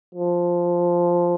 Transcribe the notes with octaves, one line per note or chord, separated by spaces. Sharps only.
F3